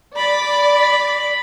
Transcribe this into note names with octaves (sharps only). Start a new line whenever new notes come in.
D5 B5